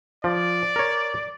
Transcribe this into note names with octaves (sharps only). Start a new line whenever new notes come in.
F3 D5
A#4 C#5